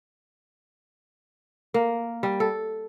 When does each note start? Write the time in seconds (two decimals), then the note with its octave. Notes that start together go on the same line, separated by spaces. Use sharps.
1.74 A#3
2.23 G3
2.40 A4